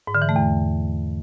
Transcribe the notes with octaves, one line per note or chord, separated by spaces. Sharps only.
G#2
D3
E3
A3
E2